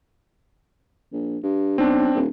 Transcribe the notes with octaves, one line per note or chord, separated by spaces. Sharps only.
A#1
G2
B1 C4 D4
D#1